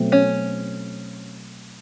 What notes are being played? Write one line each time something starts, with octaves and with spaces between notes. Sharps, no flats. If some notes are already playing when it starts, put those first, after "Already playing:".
Already playing: B2 F#3 A3 C4
C#4